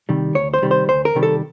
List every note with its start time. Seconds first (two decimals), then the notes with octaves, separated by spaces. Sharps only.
0.09 C3 D#3 G3
0.35 D2 C#5
0.54 C5
0.62 C3 D#3 G3
0.71 C5
0.89 D2 C5
1.05 A#4
1.15 C3 D#3 G3
1.23 A4